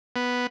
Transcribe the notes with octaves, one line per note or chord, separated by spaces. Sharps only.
B3